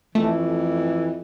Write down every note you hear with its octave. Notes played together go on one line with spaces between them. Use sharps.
F2 E3 A3